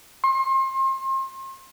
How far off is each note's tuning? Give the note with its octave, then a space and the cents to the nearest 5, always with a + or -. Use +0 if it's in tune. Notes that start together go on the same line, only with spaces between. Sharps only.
C6 +35